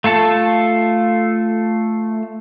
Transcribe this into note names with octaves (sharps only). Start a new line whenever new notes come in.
A3 F4 A4 A5